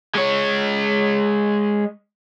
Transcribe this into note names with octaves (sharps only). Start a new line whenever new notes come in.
G#3 C#5